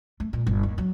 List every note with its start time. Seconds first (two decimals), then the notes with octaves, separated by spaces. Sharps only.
0.20 A3
0.33 A#2
0.47 G1
0.63 D#2
0.78 F#3